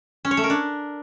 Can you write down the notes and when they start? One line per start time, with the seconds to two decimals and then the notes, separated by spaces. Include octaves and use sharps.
0.25 C#4
0.31 C#5
0.37 A3
0.44 A#4
0.50 D4